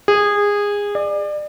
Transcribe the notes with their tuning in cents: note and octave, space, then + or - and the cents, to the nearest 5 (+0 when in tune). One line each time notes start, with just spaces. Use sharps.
G#4 -20
D5 +30